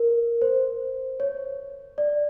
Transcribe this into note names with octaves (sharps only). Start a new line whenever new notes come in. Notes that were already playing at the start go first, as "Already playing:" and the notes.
Already playing: A#4
C5
C#5
D5